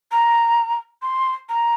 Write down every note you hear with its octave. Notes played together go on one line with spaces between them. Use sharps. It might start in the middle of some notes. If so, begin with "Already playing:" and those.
A#5
C6
A#5